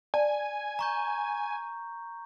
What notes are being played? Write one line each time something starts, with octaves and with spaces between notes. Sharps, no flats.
D5 G#5 A5
A#5 C#6 G6